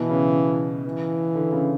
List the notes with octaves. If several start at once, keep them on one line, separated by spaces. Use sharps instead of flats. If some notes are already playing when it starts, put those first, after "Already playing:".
Already playing: B2 E3
C#3
E3
D3
C#3